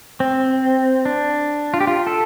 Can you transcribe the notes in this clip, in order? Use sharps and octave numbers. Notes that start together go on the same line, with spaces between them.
C4
D4
F4
G4
F4
A4